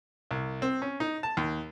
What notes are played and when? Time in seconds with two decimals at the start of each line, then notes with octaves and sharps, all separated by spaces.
0.31 C2
0.62 C4
0.82 C#4
1.00 D#4
1.23 A5
1.37 D#2